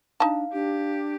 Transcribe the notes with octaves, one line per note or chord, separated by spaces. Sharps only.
D4 D#4 F5 A5
D4 G4